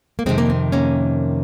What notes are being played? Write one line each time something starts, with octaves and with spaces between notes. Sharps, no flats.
A#3
F2 C3 D#3 G#3 C4
A#3
C4
A#3 C#4